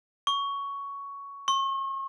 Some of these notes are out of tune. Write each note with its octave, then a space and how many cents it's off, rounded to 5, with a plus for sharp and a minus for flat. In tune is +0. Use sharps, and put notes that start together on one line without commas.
C#6 +10
C#6 -40